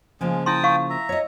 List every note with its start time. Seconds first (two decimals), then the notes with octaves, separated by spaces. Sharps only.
0.21 C#3 F3 G#3 A#3
0.46 E4 G5 A5 C6 D#6
0.63 E4 F5 C#6
0.90 E5 A#5
1.09 C#5 D#5